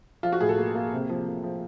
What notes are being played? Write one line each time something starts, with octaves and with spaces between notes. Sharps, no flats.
F3 F4
F#4
A2 G#4
A4
A#3
A#3
C3
F3
A#3
F3